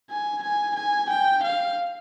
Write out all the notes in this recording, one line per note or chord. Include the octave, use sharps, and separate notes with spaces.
G#5
G#5
G#5
G5
F5